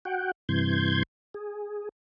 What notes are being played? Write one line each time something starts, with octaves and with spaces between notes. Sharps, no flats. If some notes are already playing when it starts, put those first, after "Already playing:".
F#4 F#5 G5
G2 C3 E3 C6 G6 G#6
G#4